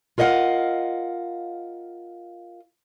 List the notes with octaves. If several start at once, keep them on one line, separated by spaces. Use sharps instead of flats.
F4 A#4 D#5 F5 F#5